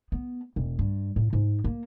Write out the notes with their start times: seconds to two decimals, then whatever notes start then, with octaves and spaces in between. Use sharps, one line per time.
0.12 B3
0.56 E1
0.79 G2
1.16 A2
1.33 G#2
1.64 A#3